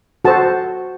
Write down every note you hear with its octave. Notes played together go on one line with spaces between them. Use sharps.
F#4 A4 C5 A5